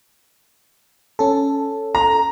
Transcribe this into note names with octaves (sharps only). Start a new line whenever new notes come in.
C#4 A4
A#5